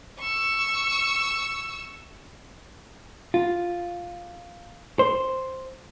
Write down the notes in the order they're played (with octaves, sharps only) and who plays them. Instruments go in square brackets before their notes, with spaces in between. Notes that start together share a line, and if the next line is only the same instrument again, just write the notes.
[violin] C#6 E6
[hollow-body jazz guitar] F4
C5